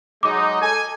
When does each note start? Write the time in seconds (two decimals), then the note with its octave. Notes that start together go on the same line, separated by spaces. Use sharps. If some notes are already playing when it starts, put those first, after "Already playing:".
0.23 F#3 G#3 D#4 D6
0.61 A4 G#5